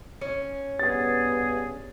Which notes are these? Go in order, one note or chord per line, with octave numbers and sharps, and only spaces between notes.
C#4
G2 B3 G#4 A6